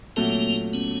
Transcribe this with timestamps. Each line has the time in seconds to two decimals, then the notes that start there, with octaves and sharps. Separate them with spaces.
0.16 A#2 F#3 A3 A#3 C4
0.73 B3 C#4